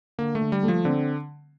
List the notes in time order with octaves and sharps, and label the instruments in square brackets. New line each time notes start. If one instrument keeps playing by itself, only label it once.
[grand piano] D3 [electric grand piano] A#3
[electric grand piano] A3
[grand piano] D3
[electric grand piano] G3
[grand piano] A3
[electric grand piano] F3
[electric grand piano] D3 [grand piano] C4